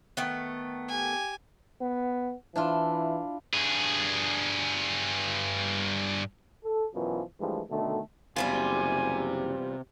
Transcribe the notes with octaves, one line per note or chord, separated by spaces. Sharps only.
D#3 A3 B3
G4 G#5
B3
E3 D4 E4 F4
G2 G#4
A4
F#2 B2 E3 F3
G2 E3 F3 G#3 A3
B2 D3 D#3 A3
F#1 E2 C3 G3 F4 G#5